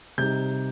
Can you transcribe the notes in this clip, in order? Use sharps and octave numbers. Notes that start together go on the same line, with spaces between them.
C3 G3 D#4 G6